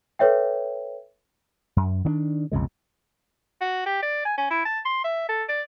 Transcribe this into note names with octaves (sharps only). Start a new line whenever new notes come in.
A4 B4 C#5 E5 G5
F#2
D#3 C4 D4
B1 F2 C#3 G#3
F#4
G4
D5
G#5
C#4
E4
A5
C6
E5
A4
D5